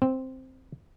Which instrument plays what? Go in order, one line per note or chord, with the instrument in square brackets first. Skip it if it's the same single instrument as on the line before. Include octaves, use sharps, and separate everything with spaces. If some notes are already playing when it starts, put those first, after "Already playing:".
[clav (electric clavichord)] C4